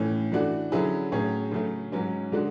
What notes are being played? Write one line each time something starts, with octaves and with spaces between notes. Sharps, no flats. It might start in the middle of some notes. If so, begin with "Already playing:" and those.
Already playing: A2 E3 A3 C#4
E3 A3 D4 F#4
D3 F#3 C#4 E4 G#4
A2 F#3 C#4 G#4 C#5
C#3 F#3 A3 C#4
G#2 F#3 C#4
D3 G#3 D4 F#4